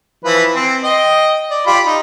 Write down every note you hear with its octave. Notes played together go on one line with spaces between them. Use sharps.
E3 F3 B4
C4
D#5 G5
D5
F4 G4 B5
D#4